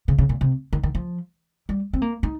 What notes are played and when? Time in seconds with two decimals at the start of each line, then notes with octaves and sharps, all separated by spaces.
0.08 C#3
0.18 C#3
0.29 A#2
0.41 C3
0.73 D#3
0.83 D#3
0.95 F3
1.69 G3
1.93 C4
2.02 A#3
2.23 D#4